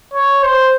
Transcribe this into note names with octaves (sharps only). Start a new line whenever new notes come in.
C#5
C5